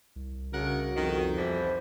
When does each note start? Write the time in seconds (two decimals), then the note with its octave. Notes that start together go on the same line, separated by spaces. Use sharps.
0.16 C2
0.53 D2 C#3 F#4 A#4 F#5
0.96 F2 D#3
1.37 B2 E3 G3 C5